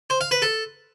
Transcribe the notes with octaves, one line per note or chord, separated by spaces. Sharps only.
C5
F5
B4
A4